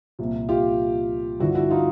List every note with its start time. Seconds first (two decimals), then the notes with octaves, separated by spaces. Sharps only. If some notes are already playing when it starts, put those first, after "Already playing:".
0.19 C2 A#2 F3
0.49 F4 G4
1.40 G2 D3 F3 E4 F#4
1.55 E4 F#4
1.70 D#4 F4